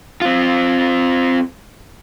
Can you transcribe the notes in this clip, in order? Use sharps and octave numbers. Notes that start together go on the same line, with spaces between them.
C4 F4